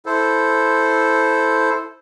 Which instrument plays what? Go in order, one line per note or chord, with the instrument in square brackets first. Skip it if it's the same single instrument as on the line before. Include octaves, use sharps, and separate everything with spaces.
[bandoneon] E4 A4 C5